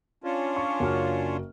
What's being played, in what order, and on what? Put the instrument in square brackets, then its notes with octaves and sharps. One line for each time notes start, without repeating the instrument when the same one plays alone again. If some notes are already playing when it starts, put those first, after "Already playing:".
[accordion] C#4 D4 F4
[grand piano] C#6
F#1 F#4 F6